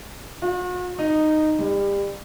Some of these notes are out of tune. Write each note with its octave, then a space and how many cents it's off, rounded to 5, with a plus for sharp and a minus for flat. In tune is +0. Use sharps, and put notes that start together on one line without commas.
F#4 -45
D#4 -10
G3 +30